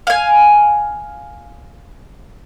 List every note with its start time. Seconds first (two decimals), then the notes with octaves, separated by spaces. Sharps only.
0.07 F5 G#5